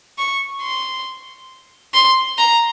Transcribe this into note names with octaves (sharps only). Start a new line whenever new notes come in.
C#6
C6
C6
A#5